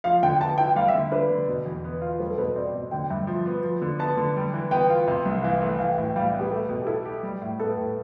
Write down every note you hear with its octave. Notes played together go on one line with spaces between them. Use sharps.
F3 F5
D3 G5
B3 A5
E4 G5
G3 F5
E5
D3
D4 B4
D3
B2
E2
B3
F4
G3 B4
A4
B2 B4
C4 D5
B2
D3 G5
G2 E5
F3
B3
F3
D3
B3 A5
D3
G3
E3
B3 G5
F4
C3
C2
E3 F5
A3
E3 F5
G5
A2
G5
G3 F5
E5
B3
G4
A3 A4
B2
G4
E4 A4
G4
G3
A2
B3 A4
A2